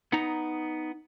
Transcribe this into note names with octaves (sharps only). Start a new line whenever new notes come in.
B3 D#4 A#5